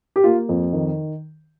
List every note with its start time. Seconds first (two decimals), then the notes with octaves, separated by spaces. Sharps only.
0.16 G4
0.24 A#3 F4
0.49 F2
0.73 D#3